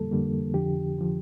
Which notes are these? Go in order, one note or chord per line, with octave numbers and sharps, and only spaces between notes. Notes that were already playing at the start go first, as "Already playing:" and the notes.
Already playing: F2 D3 G3 A#3 A4
F2 D3 G3 A#3
F2 D3 F3 G4
D3 F3